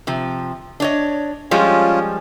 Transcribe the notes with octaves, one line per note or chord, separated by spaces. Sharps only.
C3 F3
D4 C#5 D#5
F3 G3 G#3 C#4 F4